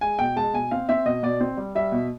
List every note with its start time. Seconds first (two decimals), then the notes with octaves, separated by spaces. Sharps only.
0.01 G#3 G#5
0.19 B2 G5
0.36 G#3 A5
0.53 B2 G#5
0.71 C4 F5
0.89 C4 E5
1.05 B2 D#5
1.23 B2 D5
1.41 C4
1.57 G3
1.75 G3 E5
1.92 B2